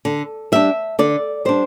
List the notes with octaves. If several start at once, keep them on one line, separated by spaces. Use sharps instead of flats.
D3
G3 D4 E5
D3 D5
G3 D4 C5